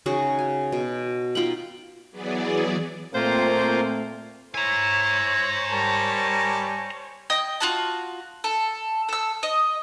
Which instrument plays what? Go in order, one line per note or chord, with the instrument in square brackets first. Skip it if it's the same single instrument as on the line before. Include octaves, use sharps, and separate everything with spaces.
[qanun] C#3 D#4 F#4 G#4
G#5
B2
D#4 F4 G5 B5
[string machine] E3 F#3 B3 G#4 D5
[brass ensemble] A#2 C4 [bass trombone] A3 [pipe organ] A#3 F4 [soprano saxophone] C5
[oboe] E4 [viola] C5 C#5 [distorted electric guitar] G#5 A#5
[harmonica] G3 A5 [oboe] A#4
[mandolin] D#5 G5 D#6
F4 F#4 A5
A4
A4 E6
D#5